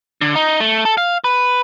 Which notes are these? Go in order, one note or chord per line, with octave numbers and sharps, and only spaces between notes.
D3
D#4
A3
A4
F5
B4